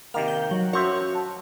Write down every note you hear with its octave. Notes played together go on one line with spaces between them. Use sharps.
C3 D#3 A#3 F6
G6
F#3
F#2 F#4 C5 C#5 E5
A5